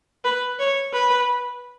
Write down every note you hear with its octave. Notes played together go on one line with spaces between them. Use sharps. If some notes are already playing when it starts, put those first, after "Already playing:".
B4
C#5
B4